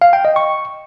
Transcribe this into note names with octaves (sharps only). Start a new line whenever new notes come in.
F5
G5
D#5
C#6